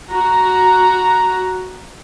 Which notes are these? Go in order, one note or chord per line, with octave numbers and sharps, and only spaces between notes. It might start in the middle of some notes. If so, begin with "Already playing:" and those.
F#4 A#5